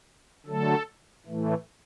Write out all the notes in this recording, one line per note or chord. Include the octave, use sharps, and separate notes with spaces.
D3 F#3 A3 A4
A2 E3 A3